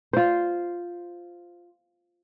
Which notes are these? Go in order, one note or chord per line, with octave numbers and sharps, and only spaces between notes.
F4 C5